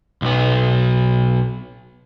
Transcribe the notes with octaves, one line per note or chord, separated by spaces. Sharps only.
B1 B3